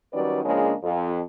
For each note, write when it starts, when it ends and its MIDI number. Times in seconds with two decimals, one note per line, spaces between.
0.13 0.41 51
0.13 0.41 54
0.13 0.41 55
0.13 0.41 61
0.13 0.41 71
0.13 0.41 74
0.44 0.74 49
0.44 0.74 53
0.44 0.74 56
0.44 0.74 58
0.44 0.74 61
0.44 0.74 62
0.83 1.21 41